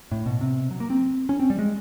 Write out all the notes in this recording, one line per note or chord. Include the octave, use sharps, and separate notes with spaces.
A2
B2
C3
F#3
A#3
C4
C#4
C4
G3
G#3